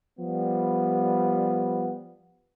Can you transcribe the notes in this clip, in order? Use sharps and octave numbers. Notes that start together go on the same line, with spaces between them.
F3 G3 B3